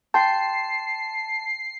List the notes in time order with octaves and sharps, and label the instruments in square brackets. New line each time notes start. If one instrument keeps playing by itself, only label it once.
[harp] G5 C6 [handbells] A5 [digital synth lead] C7